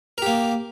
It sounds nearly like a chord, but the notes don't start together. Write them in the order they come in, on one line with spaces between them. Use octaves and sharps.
A#4 G4 A#3